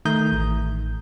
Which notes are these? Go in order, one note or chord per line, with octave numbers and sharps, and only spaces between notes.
D#3 A3 D#4 A#5 D#6 G6
A1